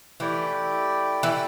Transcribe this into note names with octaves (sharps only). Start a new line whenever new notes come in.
E3 A3 E4 G4 D5 G5
E3